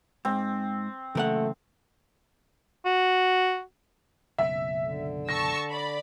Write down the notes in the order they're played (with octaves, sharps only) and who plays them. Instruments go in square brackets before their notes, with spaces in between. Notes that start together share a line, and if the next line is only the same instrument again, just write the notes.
[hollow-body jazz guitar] G#2 [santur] C4
[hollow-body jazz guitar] A#2 A#4 F#5 [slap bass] C#3 E3 F#3 [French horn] A3
[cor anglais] F#4
[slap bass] F#1 B1 C#3 [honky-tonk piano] E5
[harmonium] D3
[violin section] A5 C#6 E6 [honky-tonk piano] A#6
[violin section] D5 B5